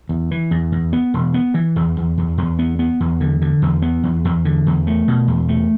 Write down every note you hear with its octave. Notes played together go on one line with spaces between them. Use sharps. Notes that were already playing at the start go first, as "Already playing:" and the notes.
E2
E3
E2
E2
B3
E1
B3
E3
E2
E2
E2
E2
B3
B3
E2
D3
D3
E2
B3
E2
E2
D3
E2
A3
B2
E2
A3